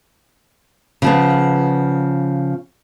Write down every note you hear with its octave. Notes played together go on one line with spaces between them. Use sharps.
C#3 F3 B3